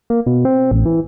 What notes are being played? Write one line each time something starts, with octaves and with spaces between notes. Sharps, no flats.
A#3
B2
C4
A1
E3